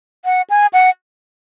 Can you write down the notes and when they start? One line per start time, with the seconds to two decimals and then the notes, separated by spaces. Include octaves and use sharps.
0.25 F#5
0.50 G#5
0.73 F#5